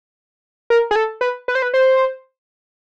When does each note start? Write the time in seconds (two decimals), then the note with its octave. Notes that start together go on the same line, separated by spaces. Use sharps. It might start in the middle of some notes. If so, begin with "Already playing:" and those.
0.70 A#4
0.91 G#4
0.96 A4
1.21 B4
1.48 B4
1.55 C5
1.62 B4
1.74 C5